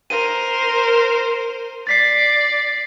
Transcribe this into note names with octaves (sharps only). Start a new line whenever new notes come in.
A#4 C5 D#7
D5 A6 B6 C7